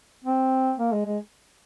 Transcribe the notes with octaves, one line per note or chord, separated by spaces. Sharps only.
C4
A#3
G#3
G#3